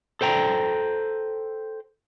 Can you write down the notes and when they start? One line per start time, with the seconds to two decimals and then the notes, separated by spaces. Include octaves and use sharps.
0.21 A4 C5 G5 A#5